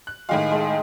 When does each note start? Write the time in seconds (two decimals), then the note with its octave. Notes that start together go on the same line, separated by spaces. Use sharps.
0.07 F#6
0.29 A2 D#3 G#3 G4 F5 C6
0.51 G#3 A4